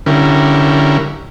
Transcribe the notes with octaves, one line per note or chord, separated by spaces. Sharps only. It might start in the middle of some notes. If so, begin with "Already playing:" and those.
D3 G3 C#4 E4 A#4